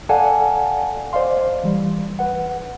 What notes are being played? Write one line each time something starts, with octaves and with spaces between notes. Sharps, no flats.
A4 D5 F5 F#5 G#5 A5
C5 D5 D#5 F5 C6
E3 G3
B4 F#5